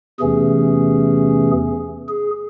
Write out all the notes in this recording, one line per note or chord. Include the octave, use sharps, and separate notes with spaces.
E2 C3 E3 A3 C#4 G#4
G#4